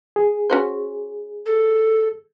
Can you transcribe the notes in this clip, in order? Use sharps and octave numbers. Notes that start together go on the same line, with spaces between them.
G#4
C#4 F#4 C5
A4